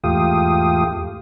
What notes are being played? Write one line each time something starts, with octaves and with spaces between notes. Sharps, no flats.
E2 G#2 A3 F4 G4 D#6